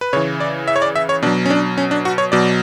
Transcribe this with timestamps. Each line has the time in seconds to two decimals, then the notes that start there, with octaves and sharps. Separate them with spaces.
0.01 B4
0.13 C#3 E3 C#5
0.40 D5
0.68 E5
0.76 C#5
0.82 D5
0.96 E5
1.09 C#5
1.22 B2 D4
1.27 F#3
1.46 C#4
1.50 D4
1.78 C#4
1.91 D4
2.05 F#4
2.18 C#5
2.32 B2 F#3 D5